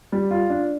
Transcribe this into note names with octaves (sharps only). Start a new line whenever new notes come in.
G3
F4
D4